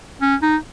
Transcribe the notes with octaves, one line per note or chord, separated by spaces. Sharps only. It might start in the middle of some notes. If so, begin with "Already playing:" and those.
C#4
D#4